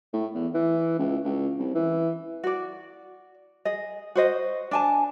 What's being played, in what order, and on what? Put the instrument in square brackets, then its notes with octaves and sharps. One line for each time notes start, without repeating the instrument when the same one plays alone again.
[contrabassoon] A2
E2
E3
C#2
C#2
C2
E3
[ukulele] F#4 D5
G#4 D#5
F#4 C5 D#5
D4 G#5 A5